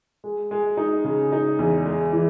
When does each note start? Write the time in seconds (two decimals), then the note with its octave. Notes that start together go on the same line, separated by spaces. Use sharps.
0.24 G#3
0.51 G#3
0.77 D#4
1.04 C#3
1.32 D#4
1.59 E2
1.86 G#3
2.13 E3